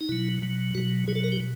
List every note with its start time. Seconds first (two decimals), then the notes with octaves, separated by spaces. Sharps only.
0.01 D#4
0.09 B2 F#3 E4
0.42 B2 F#3
0.75 B2 F#3 F#4
1.08 B2 F#3 G#4
1.15 A4
1.24 A#4
1.32 G4
1.40 B2